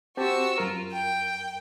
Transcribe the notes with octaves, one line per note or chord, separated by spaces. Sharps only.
C4 F#4 G4 A5 E6
F#2 F4 A#4
G5